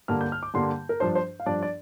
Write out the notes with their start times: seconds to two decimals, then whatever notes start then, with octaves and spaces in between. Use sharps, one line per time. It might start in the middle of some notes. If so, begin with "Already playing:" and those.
0.08 G2 D3 G3 A#3 F6
0.21 G6
0.32 F6
0.43 D6
0.54 G2 D3 G3 A#3 C6
0.89 A#4
1.00 G2 F3 D4 C5
1.15 C5
1.40 F5
1.46 G2 F3 D4 D5
1.62 D5